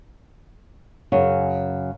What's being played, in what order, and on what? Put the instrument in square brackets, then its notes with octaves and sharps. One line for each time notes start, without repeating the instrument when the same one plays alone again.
[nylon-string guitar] F#2 C#3 C#5